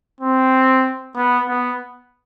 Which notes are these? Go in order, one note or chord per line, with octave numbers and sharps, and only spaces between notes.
C4
B3
B3